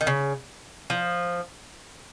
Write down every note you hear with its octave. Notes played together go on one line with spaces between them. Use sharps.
D#3
C#3
F3